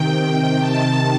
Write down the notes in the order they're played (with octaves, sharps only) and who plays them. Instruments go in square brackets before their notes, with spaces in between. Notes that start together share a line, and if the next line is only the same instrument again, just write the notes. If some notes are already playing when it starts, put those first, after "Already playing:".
Already playing: [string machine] C3 D#3 G5
C3 D#3 A5